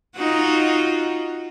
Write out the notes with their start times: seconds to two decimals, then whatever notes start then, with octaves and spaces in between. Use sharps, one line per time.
0.16 D#4 F4 F#4